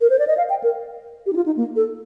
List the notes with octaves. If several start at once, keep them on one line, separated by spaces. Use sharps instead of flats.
A#4
C5
D5
D#5
F5
G5
A#4
G4
D#4
F4
D#4
A#3
A4